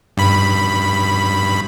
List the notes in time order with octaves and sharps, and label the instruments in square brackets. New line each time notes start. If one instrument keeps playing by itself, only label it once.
[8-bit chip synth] G2 B5